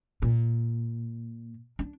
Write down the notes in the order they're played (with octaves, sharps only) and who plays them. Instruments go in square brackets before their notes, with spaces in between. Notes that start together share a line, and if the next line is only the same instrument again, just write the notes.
[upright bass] A#2
D4